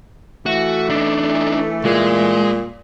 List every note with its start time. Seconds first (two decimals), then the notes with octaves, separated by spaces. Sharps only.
0.46 E3 A3 F#4
0.90 D4 D#4
1.85 A#2 G#3